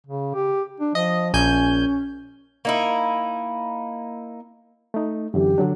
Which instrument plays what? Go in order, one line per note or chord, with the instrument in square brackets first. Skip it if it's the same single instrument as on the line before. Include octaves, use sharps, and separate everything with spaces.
[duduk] C#3
G4
D4
[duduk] F3 [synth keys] D#5
[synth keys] A#1 G#5 G6 [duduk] C#4
[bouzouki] A#3 D#4 E4
[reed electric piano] A3 D#4
[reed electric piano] F#2 D3 E3 [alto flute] G4
[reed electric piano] D3 F#3 D4